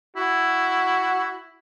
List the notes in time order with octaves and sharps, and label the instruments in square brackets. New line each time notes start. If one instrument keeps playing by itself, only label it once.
[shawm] E4 [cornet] F#4